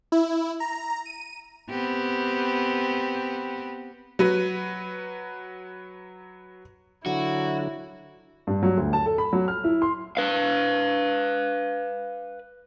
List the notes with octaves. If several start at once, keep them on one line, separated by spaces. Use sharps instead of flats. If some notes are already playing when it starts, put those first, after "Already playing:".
E4
A#5
D#7
B3 C4 G4
F#3 F#4 B4
D3 F#3 E4 F#4
G2
F#3
D2
A5
A4
B5
F#3
F6
E4
C6
B4 F5